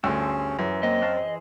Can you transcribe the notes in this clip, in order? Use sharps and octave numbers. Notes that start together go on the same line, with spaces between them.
D2 G2 A3 C#4 G#4 C6 E6
F#2 E3
A#3 C4 D#5
F#4 F5 A5
E3 G#4 C5